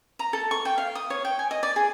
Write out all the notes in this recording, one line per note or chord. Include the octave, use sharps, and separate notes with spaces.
A#5
A4
C#6
G5
F5
D#6
C#5
G5
G#5
D#5
D5
G#4